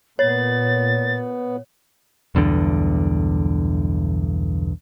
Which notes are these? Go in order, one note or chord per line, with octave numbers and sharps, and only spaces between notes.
A#2 B3 C#5 A6
B1 E2 G2 D3